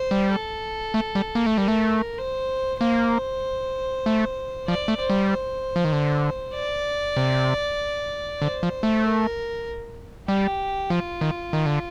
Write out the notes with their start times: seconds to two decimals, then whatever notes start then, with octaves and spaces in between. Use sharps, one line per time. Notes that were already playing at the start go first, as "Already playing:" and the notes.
Already playing: C5
0.11 G3
0.32 A4
0.94 A3
1.15 G3
1.35 A#3
1.46 A3
1.57 G3 A#4
1.68 A3
2.18 C5
2.81 A#3 C5
4.06 A3
4.68 F3 D5
4.88 A3
4.99 C5
5.10 G3
5.30 C5
5.76 F3
5.85 D#3
5.93 D3
6.54 D5
7.17 C3
8.42 D3 C5
8.63 F3
8.83 A3
9.04 A#4
10.28 G3 G4
10.90 F3 F4
11.21 D#3
11.53 D#3
11.66 D3